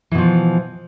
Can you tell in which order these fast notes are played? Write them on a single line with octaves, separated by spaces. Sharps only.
E3 B2 F3